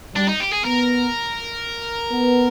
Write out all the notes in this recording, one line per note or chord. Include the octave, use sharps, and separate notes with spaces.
G3 D4
D#4
G4
G#4
B3 A#4
B3